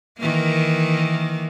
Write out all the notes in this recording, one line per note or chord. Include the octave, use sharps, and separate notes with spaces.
D#3 E3 A#3